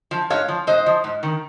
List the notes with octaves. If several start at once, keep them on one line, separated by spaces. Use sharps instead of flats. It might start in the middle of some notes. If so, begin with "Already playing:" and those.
F3
G#2 C#5 F5
F3
G#2 C5 D#5
F3
G#2
D#3